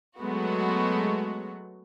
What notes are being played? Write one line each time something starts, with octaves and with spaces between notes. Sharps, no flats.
F#3 G#3 A3 B3 F#4